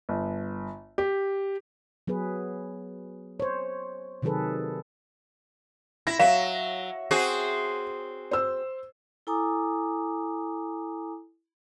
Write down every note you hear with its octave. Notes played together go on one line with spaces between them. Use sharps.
G1
G4
F#3 B3 G#4 B4
C5 C#5
C3 D#3 F#3 G#4 A4 B4
E4 A#6
F#3 E5 F5 E7
C4 F#4 G#4
C5 E6
E4 A4 G#5 A#5 D6 D#6